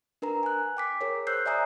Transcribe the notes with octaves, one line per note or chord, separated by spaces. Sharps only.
D4 A#4 B4 A#5
G#5 F#6
G5 D6 B6
G#4 A#4 C#5
C5 E6 F#6 G6 C7
D5 E5 G#5 A#5 D#6 E6